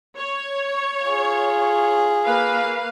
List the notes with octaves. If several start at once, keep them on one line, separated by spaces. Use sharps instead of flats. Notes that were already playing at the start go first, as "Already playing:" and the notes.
C#5
F4 G#4
A#3 B4 F5